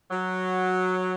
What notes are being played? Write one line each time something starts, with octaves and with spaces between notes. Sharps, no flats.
F#3